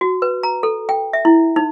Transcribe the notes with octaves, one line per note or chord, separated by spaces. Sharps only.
F#4
B4
A#5
A4
G5
E5
E4
D#4